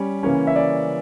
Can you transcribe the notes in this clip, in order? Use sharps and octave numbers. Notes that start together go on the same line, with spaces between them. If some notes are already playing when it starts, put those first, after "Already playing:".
Already playing: G3 C#4
C#3 E3 A#3 C#4
E5
D5